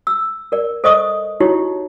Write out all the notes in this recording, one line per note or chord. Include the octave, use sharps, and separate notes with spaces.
E6
A#4 D5
A4 C5 D5 D#5 C#6 D#6
D#4 E4 F#4 G4 C#5